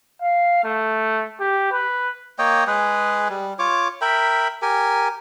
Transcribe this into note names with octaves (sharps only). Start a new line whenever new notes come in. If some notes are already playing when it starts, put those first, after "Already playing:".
F5
A3
G4
B4
A#3 C#5 D#5 G5
G#3 G#4 B4
G3
F4 C#5 D6
A#4 E5 G5 B5
G4 A#4 G#5